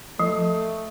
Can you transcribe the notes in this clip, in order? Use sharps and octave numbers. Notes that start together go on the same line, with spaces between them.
F3 A3